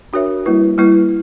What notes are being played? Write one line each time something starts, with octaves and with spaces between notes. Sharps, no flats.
D4 F#4 A#4 C#5 E5
G3 A#3 E4 B4
G3 A#3 E4 B4